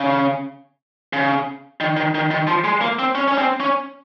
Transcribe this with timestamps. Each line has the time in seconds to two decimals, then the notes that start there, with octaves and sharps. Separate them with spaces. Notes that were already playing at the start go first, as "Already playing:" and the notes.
Already playing: C#3
1.13 C#3
1.80 D#3
1.97 D#3
2.15 D#3
2.31 D#3
2.47 F3
2.64 G#3
2.81 A#3
2.99 C4
3.15 C#4
3.28 C#4
3.38 C4
3.60 C#4